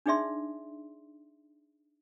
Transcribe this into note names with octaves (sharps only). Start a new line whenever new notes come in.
D4 D#4 G#4 D5 E5 C6